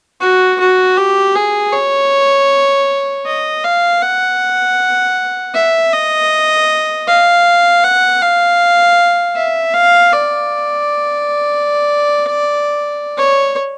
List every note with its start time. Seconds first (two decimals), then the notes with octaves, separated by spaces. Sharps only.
0.21 F#4
0.60 F#4
0.97 G4
1.36 G#4
1.73 C#5
3.27 D#5
3.64 F5
4.03 F#5
5.54 E5
5.93 D#5
7.08 F5
7.84 F#5
8.22 F5
9.36 E5
9.74 F5
10.13 D5
13.18 C#5